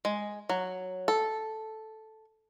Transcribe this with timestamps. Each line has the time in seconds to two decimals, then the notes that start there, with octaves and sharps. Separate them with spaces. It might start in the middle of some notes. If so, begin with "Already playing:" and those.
0.05 G#3
0.49 F#3
1.08 A4